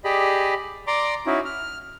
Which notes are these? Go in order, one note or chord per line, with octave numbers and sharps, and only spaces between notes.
G4 G#4 D5 D#5 B5
D5 A#5 C6 D6
C#4 D#4 E4 F#4
F6